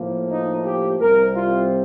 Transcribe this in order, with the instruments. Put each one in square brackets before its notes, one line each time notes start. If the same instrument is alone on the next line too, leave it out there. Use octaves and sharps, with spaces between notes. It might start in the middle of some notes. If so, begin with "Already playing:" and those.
Already playing: [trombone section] A2 F3 A#3
D#4
G4
C2 C3 G3 C4 A#4
F4